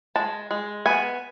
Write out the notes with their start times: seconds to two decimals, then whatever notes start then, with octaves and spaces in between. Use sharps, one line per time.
0.16 G#3 A5
0.51 G#3
0.86 B3 G#5